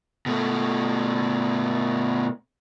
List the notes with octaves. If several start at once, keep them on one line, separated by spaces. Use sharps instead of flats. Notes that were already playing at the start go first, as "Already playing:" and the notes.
B2 A3